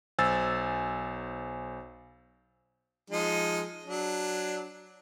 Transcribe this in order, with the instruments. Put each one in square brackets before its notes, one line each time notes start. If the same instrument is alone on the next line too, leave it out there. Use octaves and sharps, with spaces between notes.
[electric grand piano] B1 C5 G#5 E6 A6
[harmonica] F3 G#3 D#4
F#3 D4